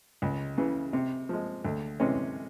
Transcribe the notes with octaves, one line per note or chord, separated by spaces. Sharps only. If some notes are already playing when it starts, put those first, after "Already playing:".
C#2
C#3 E3
C3
F3 G#3
D2
C3 E3 G#3 C#4